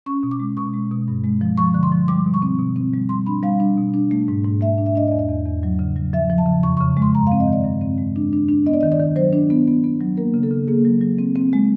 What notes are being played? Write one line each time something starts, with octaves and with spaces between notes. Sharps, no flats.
C#4 C#6
B2
D6
G#3
B2 C#6
G#3
B2
G2
G#3
F3
F3 C#6
D3
C6
F3
G3 D6
B2
C#6
C4
B2
C4
G3
G3 C6
D4 B5
G3 F5
D4
B2
D4
A3
G#2
G#2
A3 E5
D4
E5
D4 D#5
E2 D5
D#5
E2
E2
F#3
C#3
F#3
F3 E5
F3
A5
C#3
F2 C#6
C#3 C#6
G#3
C6
G2 A#5
C4 F5
D#5
D#3
D5
G2
C4
G#3
D4
D4
D4
B3 D#5
D5
D#3 D#5
D5
D#3
F#3 C5
D4
B3
B3
B3
F#3
A#3 A#4
C#3
A4
C#3
A#3 G#4
F#3
F#3
C4
C4
G#3